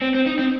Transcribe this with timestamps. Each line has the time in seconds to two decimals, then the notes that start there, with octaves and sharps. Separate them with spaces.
0.02 C4
0.15 C4
0.27 D#4
0.39 C4